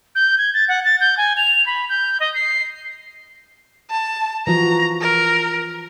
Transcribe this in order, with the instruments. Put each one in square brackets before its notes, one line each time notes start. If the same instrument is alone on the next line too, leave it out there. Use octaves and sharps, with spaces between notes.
[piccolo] G6
G#6
A6
F#5
A6
G6
G#5
F7
B5
G6
D#5
C7
[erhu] A5
[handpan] E3 F3 F#4 [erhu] A#5
[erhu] A#4